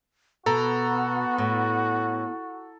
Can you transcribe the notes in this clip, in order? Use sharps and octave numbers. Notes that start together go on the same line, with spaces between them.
B2 B3 F#4 A4 A#5
A2